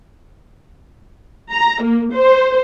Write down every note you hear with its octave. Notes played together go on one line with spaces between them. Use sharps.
A#5
A#3
C5